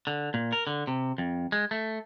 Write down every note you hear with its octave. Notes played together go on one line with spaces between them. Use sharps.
D3
A#2
A#4
D3
C3
F2
G#3
A3